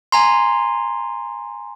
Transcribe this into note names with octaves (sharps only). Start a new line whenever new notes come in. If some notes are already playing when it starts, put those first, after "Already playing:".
G#5 A#5 C6